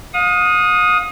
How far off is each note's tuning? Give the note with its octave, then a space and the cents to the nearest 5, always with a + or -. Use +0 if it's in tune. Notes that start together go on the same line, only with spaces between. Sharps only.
F5 +45 D#6 +0